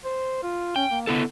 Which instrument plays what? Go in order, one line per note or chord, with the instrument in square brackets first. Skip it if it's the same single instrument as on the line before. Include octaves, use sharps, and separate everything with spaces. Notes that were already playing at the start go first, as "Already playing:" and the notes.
[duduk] C5
F4
[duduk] C#4 [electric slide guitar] G5
[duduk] A#3
[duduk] D3 [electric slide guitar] B3 E4 A4